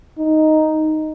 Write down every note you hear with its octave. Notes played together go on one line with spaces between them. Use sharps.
D#4